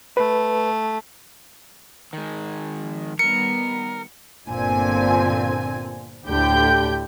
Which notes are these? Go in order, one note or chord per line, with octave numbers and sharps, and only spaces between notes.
A3 B4
D#3 G#3
F3
D#3 G3 B3 A#4 C#7
G1 A#2 D3 C4 G#5
D2 A2 D3 G4 G5 G6